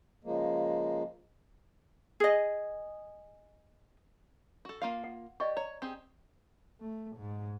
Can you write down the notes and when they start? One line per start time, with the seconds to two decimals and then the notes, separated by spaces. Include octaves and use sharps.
0.24 C#3 F3 G#3 A#3
2.20 G#4 D#5
4.65 F#4 A4
4.82 A#3 F4 F5
5.04 F#5
5.40 G4 D5 D#5 C#6
5.57 C#5 A#5
5.82 C4 G4 G#4
6.81 A3
7.17 G#2